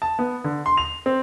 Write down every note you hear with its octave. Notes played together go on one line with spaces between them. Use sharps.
A5
B3
D3
C6
F7
C4